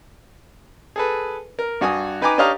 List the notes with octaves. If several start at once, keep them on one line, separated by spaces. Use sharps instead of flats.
G#4 A4 B4
A#4
G2 F#4 G#5 D#6
D#4 B4 G5 G#5 A#5 D6
D4 G4 C#5 D#5 F5 A#5